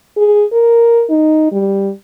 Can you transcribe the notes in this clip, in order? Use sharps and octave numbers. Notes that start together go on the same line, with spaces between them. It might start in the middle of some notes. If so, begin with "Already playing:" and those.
G#4
A#4
D#4
G3